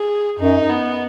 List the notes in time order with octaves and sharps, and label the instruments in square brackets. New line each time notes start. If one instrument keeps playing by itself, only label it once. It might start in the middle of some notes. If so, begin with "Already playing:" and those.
Already playing: [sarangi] G#4
[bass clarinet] F#2 [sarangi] D#4
[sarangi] B3